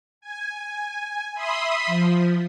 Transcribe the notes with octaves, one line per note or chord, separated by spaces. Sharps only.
G#5
E5 B5 C6 D#6
F3